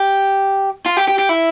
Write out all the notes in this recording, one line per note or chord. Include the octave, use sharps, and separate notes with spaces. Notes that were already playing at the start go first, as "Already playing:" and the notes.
Already playing: G4
F4
G4
G4
G4
E4